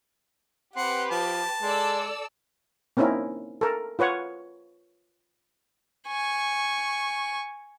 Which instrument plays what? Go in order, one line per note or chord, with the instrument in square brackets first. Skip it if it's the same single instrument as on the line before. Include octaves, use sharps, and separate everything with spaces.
[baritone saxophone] C4 [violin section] G4 B4 [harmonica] F#5
[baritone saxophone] F3 [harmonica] A5
[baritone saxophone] G#3 [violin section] A4 D5 E6
[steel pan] A#3 C4 C#4 D#4 E4 A#4
A4 A#4
F4 B4 C#5 F#5
[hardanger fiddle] G#5 C#6